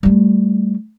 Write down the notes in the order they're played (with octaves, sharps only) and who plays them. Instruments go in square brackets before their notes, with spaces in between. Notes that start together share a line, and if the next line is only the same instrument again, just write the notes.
[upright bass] G3 A3